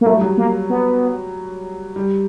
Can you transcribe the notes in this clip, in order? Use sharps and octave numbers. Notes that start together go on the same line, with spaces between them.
A#3
F#3 A3
G3
F#3
A#3
B3
G3